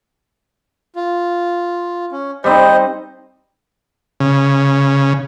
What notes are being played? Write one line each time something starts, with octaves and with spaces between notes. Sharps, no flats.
F4
C#4
G3 C4 D#4 C5 D#5
C#3